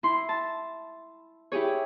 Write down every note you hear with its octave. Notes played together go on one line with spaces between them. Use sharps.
E4 C6
A5
E4 G4 G#4 C#5